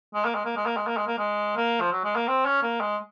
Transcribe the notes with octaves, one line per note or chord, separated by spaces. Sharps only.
G#3
A#3
G#3
A#3
G#3
A#3
G#3
A#3
G#3
A#3
G#3
A#3
F3
F#3
G#3
A#3
C4
C#4
A#3
G#3